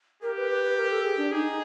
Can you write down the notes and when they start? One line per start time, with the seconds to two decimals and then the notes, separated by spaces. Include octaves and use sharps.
0.22 G4 A#4
0.37 B4
0.51 B4
0.64 B4
0.77 A#4
0.90 A4
1.04 G#4
1.18 D4
1.32 D#4 G#4